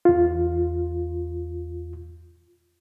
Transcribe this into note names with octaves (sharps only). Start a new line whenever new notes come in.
E2 F4